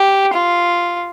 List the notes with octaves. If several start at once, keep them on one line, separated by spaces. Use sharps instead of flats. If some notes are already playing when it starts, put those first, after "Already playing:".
Already playing: G4
F4